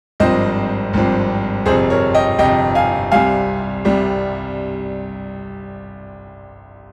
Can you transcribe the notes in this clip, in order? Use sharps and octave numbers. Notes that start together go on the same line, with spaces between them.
G#1 G2 F3 C4 C5 D#5
G#1 G2 F3 C4
G1 F2 C3 G#4 C5
A#4 C#5
D#5 G5
G1 F2 C3 D#5 G5
F5 G#5
C2 C3 G3 F5 G#5
C2 C3 G3